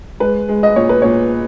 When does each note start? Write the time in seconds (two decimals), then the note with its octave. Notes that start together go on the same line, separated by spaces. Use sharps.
0.20 G#3 B4
0.49 G#3
0.63 D#5
0.76 A#2 C#5
0.89 B4
1.02 A#2 C#5